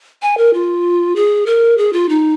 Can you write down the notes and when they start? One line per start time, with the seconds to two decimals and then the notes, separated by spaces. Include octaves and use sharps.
0.22 G#5
0.38 A#4
0.54 F4
1.16 G#4
1.46 A#4
1.78 G#4
1.93 F4
2.09 D#4